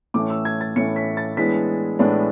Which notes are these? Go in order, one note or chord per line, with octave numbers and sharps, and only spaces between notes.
A2 E3 A3 C#4 E4 D6
E6
G#6
A6
A2 E3 A3 C#4 E4 C#7
B6
A6
A2 E3 G#3 B3 D4 B6
A2 E3 G#3 B3 D4